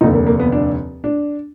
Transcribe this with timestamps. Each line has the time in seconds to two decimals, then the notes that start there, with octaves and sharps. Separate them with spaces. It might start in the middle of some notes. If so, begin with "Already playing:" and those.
0.01 F1 D#2 D3 D#4
0.14 A#3
0.27 A#3
0.40 B3
0.52 D4
1.04 D4